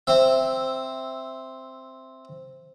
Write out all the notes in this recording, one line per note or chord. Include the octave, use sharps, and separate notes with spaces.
C4 E5